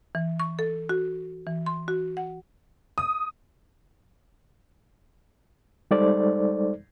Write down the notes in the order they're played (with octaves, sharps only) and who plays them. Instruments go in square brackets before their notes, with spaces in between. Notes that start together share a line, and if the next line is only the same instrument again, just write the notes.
[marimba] E3
C#6
A4
F#4
E3
C6
F#4
F#5
[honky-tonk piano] D#6
[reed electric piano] G3 G#3 D#4 A4 C5 D5